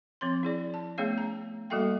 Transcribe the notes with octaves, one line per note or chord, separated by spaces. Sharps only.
F3 C4 C#5 C6
E4 G#4 D5
A5
A3 B3 C#4 G#4 C#5 F5
A#5
G3 A#3 F#4 A4 E5 G5